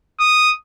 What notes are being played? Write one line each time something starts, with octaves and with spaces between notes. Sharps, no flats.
D#6